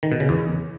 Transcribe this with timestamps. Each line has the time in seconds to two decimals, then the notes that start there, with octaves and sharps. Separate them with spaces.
0.03 D#3
0.12 B2
0.20 C#3
0.29 E2